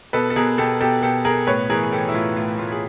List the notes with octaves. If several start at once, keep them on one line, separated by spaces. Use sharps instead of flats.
B2 A4 B4
A4
B2 G#4 A#4
B2 G4 A4
B2 G4 A4
B2 G4 A4
B2 G#4 A#4
A2 B4 C#5
E3 G#4 A#4
G#4
E3 G4 A4
E4
A2 F4
A2 F4
A2 F4
G#4